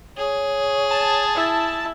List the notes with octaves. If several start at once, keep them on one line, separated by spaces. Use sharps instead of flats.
G#4 C#5
A5
E4